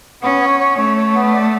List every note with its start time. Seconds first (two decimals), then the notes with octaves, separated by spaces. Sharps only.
0.22 B3 C#4
0.41 C#5
0.60 C#5
0.78 A3 C#5
0.97 C#5
1.15 B3
1.34 D5